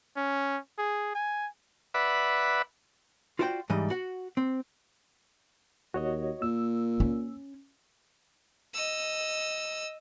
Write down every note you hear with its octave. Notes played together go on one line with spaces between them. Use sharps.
C#4
G#4
G#5
B4 D5 E5 F#5 B5
F4 F#4 C5 D5 F5 G5
G#2 E3 G3 D#5
F#4 F#5
C4
D#2 F#4 C#5 D#5
A#2 A#3 E6
C#4
D#5 E6